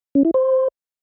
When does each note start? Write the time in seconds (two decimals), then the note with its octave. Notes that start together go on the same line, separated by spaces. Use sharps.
0.15 C#4
0.25 E4
0.34 C5